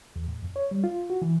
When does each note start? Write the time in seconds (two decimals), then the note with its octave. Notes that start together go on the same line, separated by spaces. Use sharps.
0.16 E2
0.28 A2
0.42 F2
0.56 C#5
0.71 G3
0.84 F4
1.10 F#4
1.22 E3